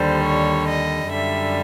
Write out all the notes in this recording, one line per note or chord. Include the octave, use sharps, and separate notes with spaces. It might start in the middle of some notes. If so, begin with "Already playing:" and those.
Already playing: D#2 D3 G3 C5
C#5
D#5
F#2 D3 G3 E5